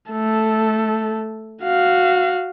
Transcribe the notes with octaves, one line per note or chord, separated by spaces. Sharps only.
A3 A4
F#4 F5